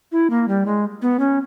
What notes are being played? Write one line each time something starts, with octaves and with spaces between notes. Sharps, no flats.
E4
A#3
G3
G#3
B3
C#4